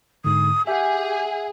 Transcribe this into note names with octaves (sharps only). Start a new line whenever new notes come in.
G#2 D3 D#6
G4 G#4 E5 F#5